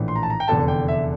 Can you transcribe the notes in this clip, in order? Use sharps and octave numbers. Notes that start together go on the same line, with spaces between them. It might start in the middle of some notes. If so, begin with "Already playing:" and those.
Already playing: A#1 A2 E3
C6
A#5
A5
A#5
G5
F1 E2 D3 A5
G5
E5